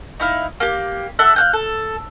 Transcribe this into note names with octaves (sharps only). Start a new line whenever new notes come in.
D#4 E4 F5
A#3 G4
A4 E5 F#5 F#6
F5 F#6 G6
A4